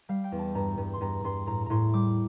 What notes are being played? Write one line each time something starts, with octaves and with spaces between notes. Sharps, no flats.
G3 F5
G5
E2
A5
G2 A#5
G2
C6
G2 A#5
G2 C6
A2 A#5
A2 A#5 C6
G3 D6